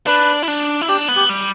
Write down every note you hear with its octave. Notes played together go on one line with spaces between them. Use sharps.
D4 B4
E4
D4
E4
D4 G4
B3
G4
G3